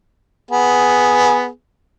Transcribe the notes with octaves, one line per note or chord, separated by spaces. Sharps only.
B3 G#4